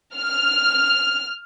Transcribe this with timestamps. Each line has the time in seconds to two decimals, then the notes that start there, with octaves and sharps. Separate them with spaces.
0.16 F6